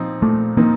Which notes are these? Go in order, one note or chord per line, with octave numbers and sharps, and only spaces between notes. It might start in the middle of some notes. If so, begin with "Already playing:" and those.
Already playing: A#2 F3 C4 D#4
A#2 A3
F3 A#3 C4 D#4